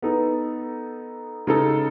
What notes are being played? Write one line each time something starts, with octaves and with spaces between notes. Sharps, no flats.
B3 D#4 A4
C#3 G#3 D#4 A4